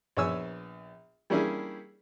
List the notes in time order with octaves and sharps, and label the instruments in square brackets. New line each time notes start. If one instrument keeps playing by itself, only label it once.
[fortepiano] A#1 B3 C#5 G#5 E6
G3 A#3 C#4 D4 E4 G#4